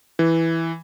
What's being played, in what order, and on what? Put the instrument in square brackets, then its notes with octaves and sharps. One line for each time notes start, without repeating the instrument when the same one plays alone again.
[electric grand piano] E3